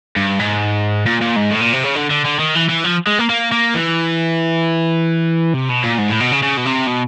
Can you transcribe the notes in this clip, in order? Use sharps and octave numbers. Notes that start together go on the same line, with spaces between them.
G2
G#2
A#2
A#2
G#2
A2
A#2
C3
C#3
D3
D3
D3
D#3
E3
E3
F3
G#3
A#3
A#3
A#3
E3
C3
B2
A#2
G#2
A2
B2
C#3
C#3
B2
C3
B2